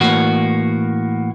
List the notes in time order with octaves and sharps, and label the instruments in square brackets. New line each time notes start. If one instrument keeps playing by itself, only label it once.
[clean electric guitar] A2 E3 A#3 F#4